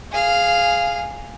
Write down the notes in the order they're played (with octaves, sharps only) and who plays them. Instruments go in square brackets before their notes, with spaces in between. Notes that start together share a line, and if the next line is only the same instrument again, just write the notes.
[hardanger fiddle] G#4 F5